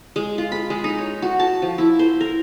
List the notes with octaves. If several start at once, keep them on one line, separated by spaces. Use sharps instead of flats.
G#3
F4
B5
G#3
D#4
C#5
F#4
A5
F3
E4
C5
A#4